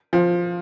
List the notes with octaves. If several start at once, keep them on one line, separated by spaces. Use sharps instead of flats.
F3